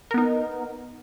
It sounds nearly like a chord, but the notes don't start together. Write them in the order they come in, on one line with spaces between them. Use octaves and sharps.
A#4 B3 D#4